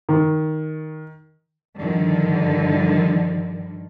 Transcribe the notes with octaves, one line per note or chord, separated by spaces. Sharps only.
D#3
G2 D3 D#3 F3